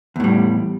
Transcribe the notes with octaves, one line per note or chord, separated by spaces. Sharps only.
E2 A2 G3